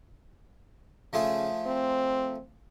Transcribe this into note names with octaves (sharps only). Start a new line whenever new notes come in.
C#3 F3 A3 G#4
C4